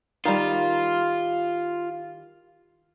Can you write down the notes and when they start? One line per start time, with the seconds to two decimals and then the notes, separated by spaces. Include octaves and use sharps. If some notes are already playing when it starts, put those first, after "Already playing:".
0.25 D#3 G3 F4